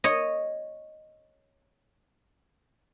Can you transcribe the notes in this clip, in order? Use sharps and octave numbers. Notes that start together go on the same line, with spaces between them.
C#5 D#5